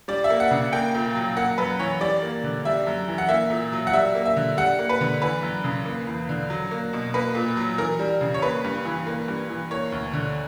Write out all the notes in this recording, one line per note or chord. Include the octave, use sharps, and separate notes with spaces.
G3 D5
E5
A#3
F#5
C#3
A#3 G5
A#2
F#3
A#3 F#5
F#2 B4
E3 C#5
G3 D5
A#3
D3
G3 E5
F#2
E3
F#5
A#3 E5
A#2
F#3
F#5
G3 E5
A#3
E5
D3
G3 F#5
A#3
B4
D3
E3 B4
F#2
C#3
A#3
E2
D3
F#3
A#3
B2
A#3 B4
A#2
F#3
E3 A#4
G3
C#3
C#5
A#3 B4
G2
E3
A#3
G2
E3
A#3 C#5
D2
D3